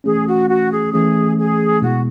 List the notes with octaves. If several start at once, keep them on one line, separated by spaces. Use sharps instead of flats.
E3 A3 C#4 G#4
F#4
F#4
G#4
E3 A3 C#4 G#4
G#4
B2 G#3 B3 E4 F#4 G#4